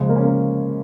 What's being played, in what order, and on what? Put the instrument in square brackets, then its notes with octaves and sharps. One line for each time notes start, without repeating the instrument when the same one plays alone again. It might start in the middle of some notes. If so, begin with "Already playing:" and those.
Already playing: [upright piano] C#2 C#3 F3 G#3
A#3
C#4
A#3